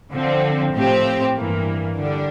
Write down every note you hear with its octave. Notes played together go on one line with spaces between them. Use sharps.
D3 F3 C4
A2 F3 C4 G4
G2 E3 A#3
D3 G3 D4